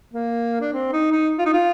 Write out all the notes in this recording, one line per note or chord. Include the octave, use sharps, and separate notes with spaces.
A#3
D4
C4
D#4
D#4
F4
D#4
F4